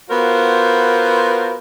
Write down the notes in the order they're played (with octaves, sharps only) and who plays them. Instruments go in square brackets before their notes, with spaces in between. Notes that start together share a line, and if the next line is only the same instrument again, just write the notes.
[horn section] B3 F4 F#4 A#4 C5